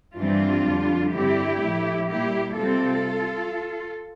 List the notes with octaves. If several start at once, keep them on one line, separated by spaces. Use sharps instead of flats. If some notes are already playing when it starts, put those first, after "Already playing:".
G2 E3 G3 C4 D4 F4
F2 D3 G3
G2 D3 G3 C4 E4 G4
A2 F3 A3
A#2 G3 A#3 E4 G4
C3 G3 C4 F4 A4